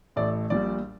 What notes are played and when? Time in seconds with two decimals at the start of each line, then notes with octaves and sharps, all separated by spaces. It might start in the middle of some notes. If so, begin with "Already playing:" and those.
0.16 A1 A2 A3 D5
0.50 A#1 A#2 G3 D5